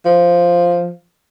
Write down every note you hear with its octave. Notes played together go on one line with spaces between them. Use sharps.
F3